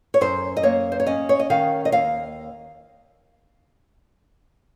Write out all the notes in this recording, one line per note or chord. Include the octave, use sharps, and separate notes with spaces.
C#5
F#2 C5
D#5
A#3 C#5
C5
C#5
C#4 D#5
C#5
D#5
D#3 F5
D#5
D#2 F5